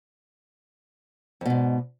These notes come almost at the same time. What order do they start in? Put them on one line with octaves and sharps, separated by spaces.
F2 B2 G#2